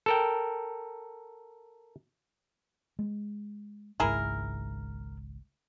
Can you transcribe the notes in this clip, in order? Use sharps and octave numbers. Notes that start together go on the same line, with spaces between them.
A4 A#4 G5
G#3
G#1 C#2 G#2 E4 G#4 A#4